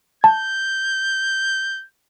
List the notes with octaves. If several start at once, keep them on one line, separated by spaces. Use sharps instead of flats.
A5 G6